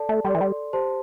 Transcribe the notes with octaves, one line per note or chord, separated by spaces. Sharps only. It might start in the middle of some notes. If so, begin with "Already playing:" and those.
Already playing: A4 D5 A5
A3
G3 A4 D5 C6
E3
G3
G4 C5 A5 C6